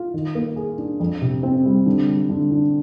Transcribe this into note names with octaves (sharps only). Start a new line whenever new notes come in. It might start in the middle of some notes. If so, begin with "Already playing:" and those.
Already playing: F4
D#3
A#3
G#4
D4
F2
C3
C4
G3
D3
G3
D3
D4